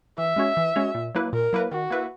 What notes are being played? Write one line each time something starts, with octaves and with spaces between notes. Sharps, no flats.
E3 E5
G#3 C#4 F#4 C#5
E3
G#3 C#4 F#4 C#5
A#2
F#3 A#3 E4 B4
A#2 A#4
F#3 A#3 E4 B4
D#3 F#4
A#3 E4 B4 E5